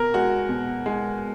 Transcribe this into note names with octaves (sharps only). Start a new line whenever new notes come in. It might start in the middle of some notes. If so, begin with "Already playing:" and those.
Already playing: B2 A#4
G#3 F#4
B2
G#3